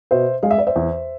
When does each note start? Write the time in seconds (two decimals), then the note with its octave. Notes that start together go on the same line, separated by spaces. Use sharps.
0.11 B2 C5 E5
0.43 G#3 F5
0.51 E5
0.58 D5
0.67 C5 E5
0.76 E2